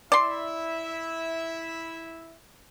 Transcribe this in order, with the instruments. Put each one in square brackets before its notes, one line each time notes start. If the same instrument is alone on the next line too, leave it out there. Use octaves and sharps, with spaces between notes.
[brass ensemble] E4 E5 [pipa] D5 C6